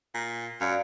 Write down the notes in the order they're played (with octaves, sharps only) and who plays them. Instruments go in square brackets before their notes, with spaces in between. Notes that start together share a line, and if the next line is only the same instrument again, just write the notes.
[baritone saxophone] A#2
[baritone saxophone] F#2 [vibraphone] D5 F5